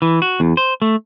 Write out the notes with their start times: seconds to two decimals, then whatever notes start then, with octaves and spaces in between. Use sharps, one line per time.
0.02 E3
0.22 F#4
0.40 E2
0.57 C5
0.82 A3